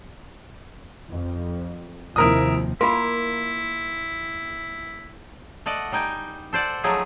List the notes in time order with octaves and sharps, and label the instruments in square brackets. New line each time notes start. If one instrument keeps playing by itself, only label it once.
[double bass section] F2
[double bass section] D#2 C3 F3 [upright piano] E4 A#4 D#6
[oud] A#3 [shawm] E4 [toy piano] F4 A#4 [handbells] C6
[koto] A3 D5 D#5 F#5
G3 D#4 G5 G#5
A4 C5 D5 F#5
F3 F#3 A3 D#4 G#4